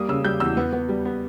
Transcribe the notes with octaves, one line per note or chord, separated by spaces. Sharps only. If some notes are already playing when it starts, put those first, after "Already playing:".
Already playing: G3 A#3 D#6
C#3 E6
G3 G6
E2 E6
B3
B3
G3
B3